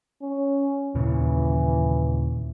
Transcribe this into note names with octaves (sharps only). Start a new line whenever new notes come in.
C#4
D#2 A#2 C#3 E3